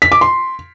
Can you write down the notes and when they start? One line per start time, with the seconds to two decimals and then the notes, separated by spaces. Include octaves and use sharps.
0.02 B6
0.12 D6
0.21 C6